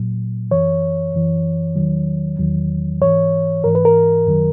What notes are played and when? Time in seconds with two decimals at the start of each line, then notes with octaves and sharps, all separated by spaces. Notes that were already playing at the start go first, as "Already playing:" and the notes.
Already playing: A#2 F#3
0.51 F#2 E3 C#5
1.14 F#2 E3
1.76 E2 D#3 F#3
2.39 E2 D#3 F#3
3.01 G#2 E3 C#5
3.64 G#2 E3 A#4
3.75 B4
3.85 A#4
4.26 F#2 D#3 F#3